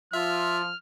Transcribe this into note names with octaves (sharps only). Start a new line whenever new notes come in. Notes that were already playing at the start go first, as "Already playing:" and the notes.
F3 F4 E5 F6